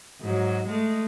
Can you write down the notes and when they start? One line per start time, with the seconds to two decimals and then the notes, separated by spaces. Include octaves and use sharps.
0.21 G#2 F#3
0.66 G#3 A3